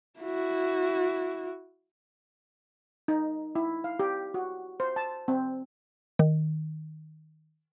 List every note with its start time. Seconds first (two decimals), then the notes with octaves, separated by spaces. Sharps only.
0.20 E4 F#4
3.08 D#4
3.55 E4
3.84 F5
3.99 G4
4.34 F#4
4.80 C5
4.96 A5
5.28 C4
6.19 D#3